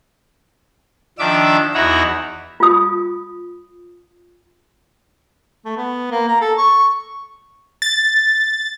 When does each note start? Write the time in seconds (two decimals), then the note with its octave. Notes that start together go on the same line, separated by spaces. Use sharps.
1.19 D#3 F3 D4 E5 D6 E6
1.74 E2 D#4 E4 F#4 E5 A#5
2.60 F4 D#6
5.65 A3
5.77 B3
6.11 A#3
6.28 A#5
6.41 A4
6.58 C#6
7.82 A6